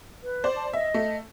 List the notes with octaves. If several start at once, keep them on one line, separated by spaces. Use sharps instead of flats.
B4
C5 D5
A5
D#5 E5
A3